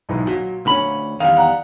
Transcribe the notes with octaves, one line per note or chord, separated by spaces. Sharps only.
B1 G#2 E3
A#2 F#3
D2 D3 C#4 B5
E2 G#2 D#3 G3 F5
F#5 A#5